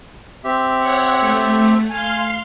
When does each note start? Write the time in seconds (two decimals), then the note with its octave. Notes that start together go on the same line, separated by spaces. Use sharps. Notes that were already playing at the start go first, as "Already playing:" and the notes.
0.44 C4 G4 E5
0.79 C#5 F#5
1.20 A3
1.89 F5 G#5 C6